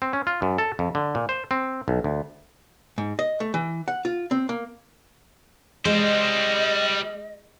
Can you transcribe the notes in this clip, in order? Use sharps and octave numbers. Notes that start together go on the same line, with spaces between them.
C4
C#4
F4
F#2
A4
F2
D3
A#2
C5
C4
B1
D2
G#2
D#5
A3
E3
F#5
F4
C4
A#3
G3 G#3 C5 D#5